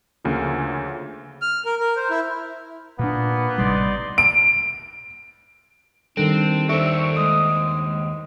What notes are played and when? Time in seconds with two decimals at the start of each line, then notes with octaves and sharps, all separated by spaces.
0.24 D2 C#3 F3 A#3
1.42 F6
1.65 A#4
1.80 A#4
1.96 C5
2.10 E4
2.99 A#2 A#3 B3 D4
3.58 A1 C3 G3 D#4 D5 C6
4.18 D7
6.17 D#3 G3 C4 D4 A4
6.69 D#2 D4 A4 C5 E5 C#6
7.17 G#3 D#6